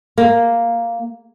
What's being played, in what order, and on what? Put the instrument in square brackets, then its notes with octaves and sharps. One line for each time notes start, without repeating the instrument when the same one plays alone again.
[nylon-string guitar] A#3